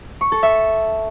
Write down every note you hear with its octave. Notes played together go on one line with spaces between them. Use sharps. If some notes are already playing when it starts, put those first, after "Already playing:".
C#6
A4
E5